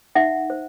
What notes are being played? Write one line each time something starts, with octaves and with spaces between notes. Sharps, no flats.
D#4 E5 F#5
C5